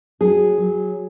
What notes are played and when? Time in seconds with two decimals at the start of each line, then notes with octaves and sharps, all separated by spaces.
0.20 F#3 G#4
0.58 F#3